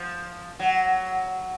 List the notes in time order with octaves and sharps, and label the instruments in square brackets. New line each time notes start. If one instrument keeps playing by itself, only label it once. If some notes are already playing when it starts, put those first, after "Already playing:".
Already playing: [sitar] F3
F#3